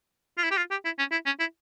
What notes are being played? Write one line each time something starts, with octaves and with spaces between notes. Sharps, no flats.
F4
E4
G4
F4
G4
E4
C#4
E4
C#4
E4